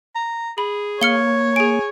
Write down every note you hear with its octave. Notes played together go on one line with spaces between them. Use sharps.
A#5
G#4 B5
A#3 C#5 F6 C#7 G7
G#4 G#5 D7